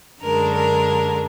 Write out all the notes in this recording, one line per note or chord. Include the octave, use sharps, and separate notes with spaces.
F#2 D3 G#3 D4 A#4
A#4